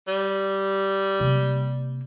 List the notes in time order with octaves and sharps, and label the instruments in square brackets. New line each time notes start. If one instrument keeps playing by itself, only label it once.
[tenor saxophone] G3
[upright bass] C3 A#3